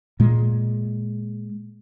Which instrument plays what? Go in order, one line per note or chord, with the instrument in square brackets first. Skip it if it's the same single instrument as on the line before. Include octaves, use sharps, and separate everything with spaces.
[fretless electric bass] A#2 G#3